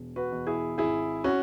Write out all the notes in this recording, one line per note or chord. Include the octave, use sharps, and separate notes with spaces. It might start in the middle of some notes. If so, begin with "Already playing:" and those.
Already playing: E1
F#4 B4
E2 B2
E4 G#4
G#1 E4 G#4
C#4 F#4